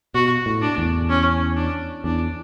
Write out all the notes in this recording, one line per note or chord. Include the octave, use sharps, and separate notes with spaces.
B2 F#4
A2
D4
E2
C#4
D4
E2 D4